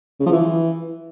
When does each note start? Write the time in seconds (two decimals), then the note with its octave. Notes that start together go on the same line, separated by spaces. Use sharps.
0.20 C#3
0.26 F3
0.32 E3